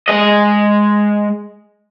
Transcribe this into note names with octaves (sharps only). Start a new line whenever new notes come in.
G#3 D#5